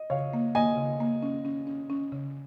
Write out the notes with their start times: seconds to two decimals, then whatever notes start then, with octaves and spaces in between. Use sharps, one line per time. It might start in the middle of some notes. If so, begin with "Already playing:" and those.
Already playing: D#5
0.10 C#3 C#5 F5
0.33 A#3
0.55 A#3 D#5 G#5
0.77 C#3
1.00 A#3
1.23 C#4
1.45 C#4
1.67 C#4
1.90 C#4
2.12 C#3